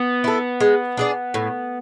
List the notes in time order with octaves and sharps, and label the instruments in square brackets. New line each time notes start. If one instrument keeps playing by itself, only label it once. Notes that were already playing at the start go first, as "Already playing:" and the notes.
Already playing: [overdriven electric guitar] B3
[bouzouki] E4 A4
G#3
D4 G#4 D5
A2